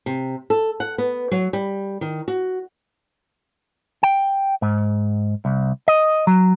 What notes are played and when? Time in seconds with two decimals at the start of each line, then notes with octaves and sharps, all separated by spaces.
0.06 C3
0.50 A4
0.80 F#5
0.98 B3
1.31 F#3
1.53 G3
2.01 D#3
2.28 F#4
4.03 G5
4.62 G#2
5.45 C2
5.88 D#5
6.27 F#3